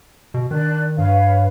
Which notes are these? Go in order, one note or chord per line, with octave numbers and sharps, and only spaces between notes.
B2
D#3 D4 F#6
G2 B4 C#5 F5